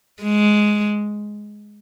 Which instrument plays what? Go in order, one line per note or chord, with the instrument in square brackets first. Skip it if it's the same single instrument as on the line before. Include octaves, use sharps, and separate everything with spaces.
[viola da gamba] G#3